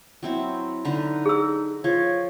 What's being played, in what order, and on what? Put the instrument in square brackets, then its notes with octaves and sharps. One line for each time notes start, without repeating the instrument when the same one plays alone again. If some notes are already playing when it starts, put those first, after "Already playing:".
[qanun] F#3 C4 E4
[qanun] D3 B4 A#5 [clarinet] D#4
[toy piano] G#4 E6
[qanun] F3 [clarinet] C#5